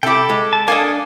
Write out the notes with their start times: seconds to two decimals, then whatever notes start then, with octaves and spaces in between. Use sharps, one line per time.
0.03 C3 E4 A4 G5 B5 D6
0.30 G#3
0.53 A5
0.68 A#3 D4 A4 D#5 G#5